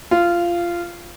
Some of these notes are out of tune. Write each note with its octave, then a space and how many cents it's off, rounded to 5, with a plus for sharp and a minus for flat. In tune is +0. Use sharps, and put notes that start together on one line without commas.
F4 -15